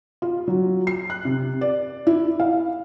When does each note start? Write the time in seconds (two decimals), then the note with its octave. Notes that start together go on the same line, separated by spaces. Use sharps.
0.22 F4
0.48 F#3
0.87 C7
1.10 F#6
1.25 C3
1.61 D5
2.07 E4
2.40 F5